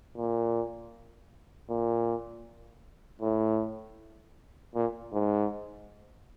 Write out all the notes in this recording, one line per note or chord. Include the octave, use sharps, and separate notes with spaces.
A#2
A#2
A2
A#2
G#2